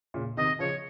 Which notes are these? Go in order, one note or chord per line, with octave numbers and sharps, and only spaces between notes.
A#2 C#3
C3 D#3 D#5
C#3 F3 C#5